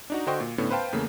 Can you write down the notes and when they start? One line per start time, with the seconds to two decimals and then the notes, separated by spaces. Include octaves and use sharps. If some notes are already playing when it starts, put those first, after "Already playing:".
0.10 D4 D#4 F#4
0.26 D3 F#4 C5 D#5 G5 C#6
0.40 A#2
0.58 A2 D3 B3 C#4
0.71 B4 C5 F5 G5 A5
0.92 E2 C#3 A3 A#3